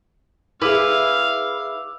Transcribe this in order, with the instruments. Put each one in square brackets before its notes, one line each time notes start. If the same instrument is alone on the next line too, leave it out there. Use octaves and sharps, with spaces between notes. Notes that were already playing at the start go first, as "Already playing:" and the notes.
[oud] E4 G#4 [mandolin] B4 [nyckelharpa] F5 [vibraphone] D6 E6